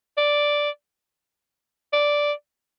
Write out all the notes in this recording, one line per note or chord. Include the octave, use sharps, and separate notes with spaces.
D5
D5